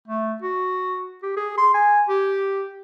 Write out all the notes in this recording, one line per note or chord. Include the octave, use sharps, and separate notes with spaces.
A3
F#4
G4
G#4
C6
G#5
G4